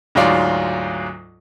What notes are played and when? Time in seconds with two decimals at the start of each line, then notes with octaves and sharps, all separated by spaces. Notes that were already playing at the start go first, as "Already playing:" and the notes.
0.15 D2 G#2 F#3 F4 D5